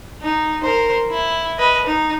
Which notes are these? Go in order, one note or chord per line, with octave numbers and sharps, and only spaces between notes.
D#4
A#4 C5
E4
B4 D#5
D#4